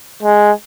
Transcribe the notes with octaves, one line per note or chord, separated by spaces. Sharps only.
G#3